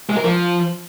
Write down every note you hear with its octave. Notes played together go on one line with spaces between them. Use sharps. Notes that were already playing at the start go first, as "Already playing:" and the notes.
G#3
A#4
F3